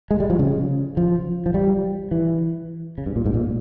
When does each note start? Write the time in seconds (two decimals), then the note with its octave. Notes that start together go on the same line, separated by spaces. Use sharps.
0.11 G#3
0.20 G3
0.30 F3
0.39 C#3
0.97 F3
1.46 F3
1.54 G3
2.11 E3
2.98 C#3
3.06 G2
3.16 A#2
3.26 G#2
3.34 A#2